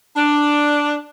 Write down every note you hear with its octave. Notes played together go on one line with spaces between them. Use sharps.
D4